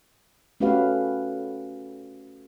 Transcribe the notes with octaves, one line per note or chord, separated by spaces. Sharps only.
A3 C#4 F#4 G4 B4 F5